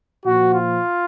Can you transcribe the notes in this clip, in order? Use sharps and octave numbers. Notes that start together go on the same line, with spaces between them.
A#2 F3 F#4
F4